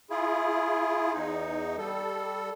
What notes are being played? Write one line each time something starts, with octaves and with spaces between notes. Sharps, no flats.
E4 F4 G#4
E2 D#4
G3 A4